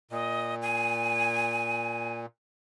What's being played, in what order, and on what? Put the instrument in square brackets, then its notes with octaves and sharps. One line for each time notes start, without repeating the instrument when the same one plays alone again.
[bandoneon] A#2 [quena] D#5
[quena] G#5